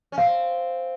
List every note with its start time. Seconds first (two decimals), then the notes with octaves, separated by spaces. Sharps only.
0.12 C#4
0.18 C4 F5